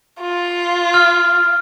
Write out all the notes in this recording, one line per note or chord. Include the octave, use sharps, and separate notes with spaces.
F4
F6